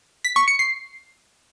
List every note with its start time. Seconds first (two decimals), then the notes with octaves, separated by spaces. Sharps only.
0.24 B6
0.36 C#6
0.48 C#7
0.59 C7